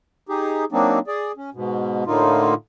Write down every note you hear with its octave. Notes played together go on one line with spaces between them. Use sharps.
D#4 G4 G#4
F#3 A#3 C4 D4 D#4
G#4 D5
C#4
G#2 B2
A2 D3 A#3 D#4 F4